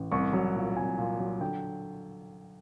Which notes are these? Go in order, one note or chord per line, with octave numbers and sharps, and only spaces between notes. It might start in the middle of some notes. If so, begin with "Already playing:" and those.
Already playing: A1
C2 C#6
F#3
A#2
C2 G#5
A#2
F#3
D3 G5